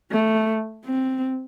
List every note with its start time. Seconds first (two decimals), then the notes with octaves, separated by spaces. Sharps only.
0.11 A3
0.85 C4